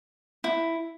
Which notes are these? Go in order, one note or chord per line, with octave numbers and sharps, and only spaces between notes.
E4